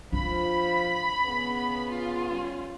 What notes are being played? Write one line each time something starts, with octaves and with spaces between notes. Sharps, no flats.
F3 D4 B5
C#3 B3
F4
G3 C#4